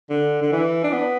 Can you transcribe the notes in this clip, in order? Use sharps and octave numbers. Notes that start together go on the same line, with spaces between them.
D3
D3
E3
D4
B3